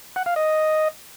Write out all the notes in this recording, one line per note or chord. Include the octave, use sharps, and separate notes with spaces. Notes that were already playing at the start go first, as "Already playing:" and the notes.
F#5
F5
D#5